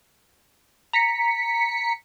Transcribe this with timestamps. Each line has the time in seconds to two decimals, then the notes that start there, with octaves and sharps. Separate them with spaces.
0.93 A#5 B6 C#7